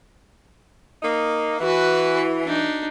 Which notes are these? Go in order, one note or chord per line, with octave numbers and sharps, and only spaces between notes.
A#3 D#4
E3 F#4 B4
D4 D#4